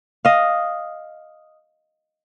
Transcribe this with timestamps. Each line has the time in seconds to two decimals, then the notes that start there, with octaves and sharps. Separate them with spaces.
0.25 D#5 F5